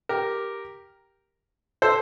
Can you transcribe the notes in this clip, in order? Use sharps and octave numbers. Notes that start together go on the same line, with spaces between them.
G4 A#4
A4 C5